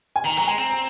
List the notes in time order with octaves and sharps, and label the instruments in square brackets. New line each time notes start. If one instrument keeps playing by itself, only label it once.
[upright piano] G#5
[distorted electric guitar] D#3 [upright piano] A#5
[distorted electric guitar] F#3 [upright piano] A#5
[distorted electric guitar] G#3 [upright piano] G#5
[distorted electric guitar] C4
[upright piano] A#5